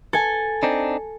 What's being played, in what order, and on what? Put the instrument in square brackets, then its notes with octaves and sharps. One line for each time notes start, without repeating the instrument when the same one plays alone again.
[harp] A4 G#5
[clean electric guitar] C4 D4 D#4